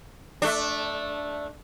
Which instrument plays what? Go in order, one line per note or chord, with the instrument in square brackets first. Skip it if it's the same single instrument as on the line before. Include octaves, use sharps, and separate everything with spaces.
[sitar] A3 D4